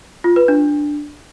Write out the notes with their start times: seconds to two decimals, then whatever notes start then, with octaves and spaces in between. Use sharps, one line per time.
0.24 F4
0.36 B4
0.48 D4